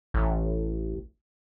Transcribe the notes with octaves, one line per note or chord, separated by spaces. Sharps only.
A1